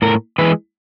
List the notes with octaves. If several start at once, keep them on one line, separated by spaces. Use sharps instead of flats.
A2 A#4
E3 G#3 B4